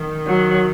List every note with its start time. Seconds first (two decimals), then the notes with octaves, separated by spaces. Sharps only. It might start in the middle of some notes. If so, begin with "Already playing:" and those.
Already playing: D#3
0.27 F#3